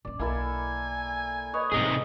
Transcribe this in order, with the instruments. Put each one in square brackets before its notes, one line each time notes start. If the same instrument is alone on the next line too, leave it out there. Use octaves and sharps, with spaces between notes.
[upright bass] F#2 C#4 [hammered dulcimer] D5
[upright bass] B1 [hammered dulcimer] A#3 E4 A4 [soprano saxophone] G#5
[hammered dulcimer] B4 C#5 D#5
[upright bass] A2 G3 [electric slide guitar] C3 D#4 G#4